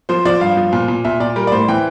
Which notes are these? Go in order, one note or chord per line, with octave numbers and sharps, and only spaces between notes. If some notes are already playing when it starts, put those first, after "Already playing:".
F3 C5
F3 D5
G2 F5
F3
A#2
A#2
A#2 E5
A#2 D5
G3 A#4
D5
A2 C5
E3 G5